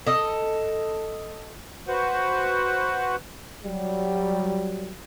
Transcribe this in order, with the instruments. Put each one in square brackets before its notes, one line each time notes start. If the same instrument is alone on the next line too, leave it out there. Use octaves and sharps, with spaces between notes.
[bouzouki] A4 D#5
[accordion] F#4 B4 C5 F#5
[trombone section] F#3 G3